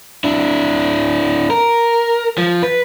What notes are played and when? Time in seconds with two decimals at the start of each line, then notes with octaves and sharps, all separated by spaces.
0.24 D4 E4
1.50 A#4
2.38 F3
2.63 B4